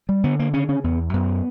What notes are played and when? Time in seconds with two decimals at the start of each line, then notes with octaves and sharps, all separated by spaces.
0.09 G3
0.24 D3 B3
0.39 A#3
0.53 C#3 C#4
0.69 C#4
0.84 E2 B3
1.13 F#2 B3